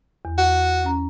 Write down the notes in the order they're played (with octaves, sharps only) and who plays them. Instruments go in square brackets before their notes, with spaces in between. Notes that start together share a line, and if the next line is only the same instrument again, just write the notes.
[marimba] E2
[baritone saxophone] F#4
[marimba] C#4 A#5